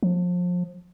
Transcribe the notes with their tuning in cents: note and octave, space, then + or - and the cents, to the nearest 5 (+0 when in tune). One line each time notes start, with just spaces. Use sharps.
F3 +30